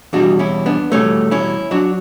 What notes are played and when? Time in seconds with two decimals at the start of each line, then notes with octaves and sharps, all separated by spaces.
0.13 E2 B2 G3 D4 F#4
0.39 C#4 E4
0.66 B3 D4
0.92 E2 B2 G3 A3 C#4
1.31 C#4 E4
1.71 F#3 D4 F#4